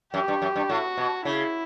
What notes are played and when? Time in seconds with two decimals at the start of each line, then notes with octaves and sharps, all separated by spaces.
0.13 F#2 G4
0.28 G2
0.42 F#2
0.56 G2
0.70 A2 F#4
0.97 B2
1.25 C#3 E4